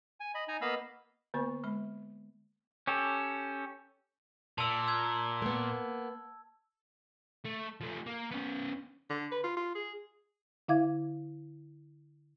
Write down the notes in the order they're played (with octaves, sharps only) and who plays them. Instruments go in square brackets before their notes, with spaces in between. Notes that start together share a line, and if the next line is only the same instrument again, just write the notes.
[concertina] G#5
D#5 B5
D#4 G#5 A#5
A#3 B3 D#5 F5 B5 E6
[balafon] D3 A#3 B3 C5 C#6
G#3 B5
[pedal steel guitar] C#4 G4 A4
[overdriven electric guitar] A#2 [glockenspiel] A5 E6
[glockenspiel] E6 G#6
[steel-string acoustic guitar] A#3 B3
[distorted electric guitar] A3
F3 A3
A#3
B3 C#4
[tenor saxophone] D3
B4
F4
F4
G#4
[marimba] D3 E4 E5 F5 D6 G#6